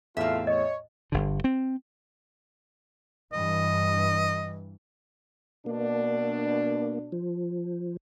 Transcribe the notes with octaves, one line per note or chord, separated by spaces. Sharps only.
E2 A2 A3 C4 F4 E5 F5
C#5 D#5
G1 D3
C4
G2 E3 D#5
B2 A#3 D4
F3